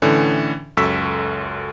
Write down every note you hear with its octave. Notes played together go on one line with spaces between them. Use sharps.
A2 D3 E3 C#4
C#2 F#2 A4 C#6 E6 B6